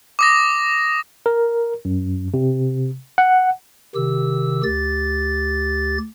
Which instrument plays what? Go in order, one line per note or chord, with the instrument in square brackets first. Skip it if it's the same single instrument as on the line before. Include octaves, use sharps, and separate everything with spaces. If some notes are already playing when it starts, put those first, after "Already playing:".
[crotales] D6 D#6 A#6
[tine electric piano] A#4
F#2
C3
F#5
[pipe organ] C3 D#3 G4 E6
D2 G4 A6